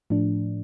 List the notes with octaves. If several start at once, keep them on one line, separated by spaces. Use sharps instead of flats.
A2 F3 A3 D4